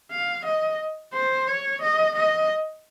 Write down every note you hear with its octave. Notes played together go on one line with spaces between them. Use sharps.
F5
D#5
C5
C#5
D#5
D#5